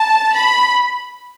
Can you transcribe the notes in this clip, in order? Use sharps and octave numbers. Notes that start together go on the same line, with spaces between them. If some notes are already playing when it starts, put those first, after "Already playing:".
Already playing: A5
B5